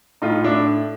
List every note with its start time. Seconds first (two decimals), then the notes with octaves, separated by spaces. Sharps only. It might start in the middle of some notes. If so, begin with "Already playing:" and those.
0.22 A2 D#4 F4
0.44 A2 D4 E4